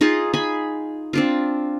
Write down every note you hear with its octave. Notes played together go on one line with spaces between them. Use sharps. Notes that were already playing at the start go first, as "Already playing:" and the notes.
D#4 F4 G#4 D#5
G#4 G#5 B5
C4 D4 F4